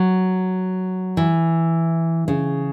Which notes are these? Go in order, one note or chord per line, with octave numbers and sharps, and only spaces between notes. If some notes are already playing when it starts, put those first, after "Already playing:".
Already playing: F#3
E3
C#3